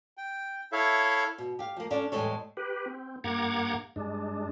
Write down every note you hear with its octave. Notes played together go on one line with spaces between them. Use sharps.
G5
E4 A4 C#5 E5 F5
B2
G4 F5
F3 A#3
C#4 D4 A4 D5 F5
E2 A2 G3 G#3 A4 C#5
G4 B4
C4
G2 A#3 F#5 A#5 D6 G#6
G2 G#3 D4